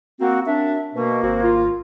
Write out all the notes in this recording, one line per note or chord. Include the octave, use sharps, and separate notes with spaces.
A#3 C4 F#4
F#2 C4 D4 E5
B2 A#3
G#1 C4 F#4
F4